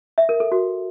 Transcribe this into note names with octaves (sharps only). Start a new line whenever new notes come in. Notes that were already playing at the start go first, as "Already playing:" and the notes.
E5
A#4
A4
F#4